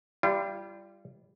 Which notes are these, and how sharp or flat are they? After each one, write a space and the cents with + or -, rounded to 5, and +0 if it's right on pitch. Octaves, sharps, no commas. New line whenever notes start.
G3 +0 F4 -40